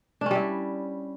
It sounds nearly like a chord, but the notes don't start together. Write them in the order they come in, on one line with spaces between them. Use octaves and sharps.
D4 C#4 G3 E4